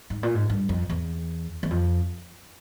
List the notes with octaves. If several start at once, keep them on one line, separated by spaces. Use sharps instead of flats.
G#2
A#2
G#2
G2
F2
E2
E2
F2